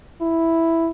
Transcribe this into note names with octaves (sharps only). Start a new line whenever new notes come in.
E4